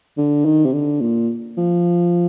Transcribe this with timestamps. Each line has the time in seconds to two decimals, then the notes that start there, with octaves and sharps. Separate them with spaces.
0.17 D3
0.45 D#3
0.65 C3
0.73 D3
1.01 A#2
1.57 F3